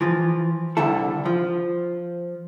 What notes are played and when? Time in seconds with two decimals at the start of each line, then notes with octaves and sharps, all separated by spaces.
0.01 E3 F3
0.77 C2 D3 E4 A4
1.25 F3